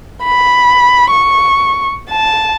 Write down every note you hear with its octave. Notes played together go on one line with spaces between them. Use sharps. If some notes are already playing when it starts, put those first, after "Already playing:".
B5
C#6
A5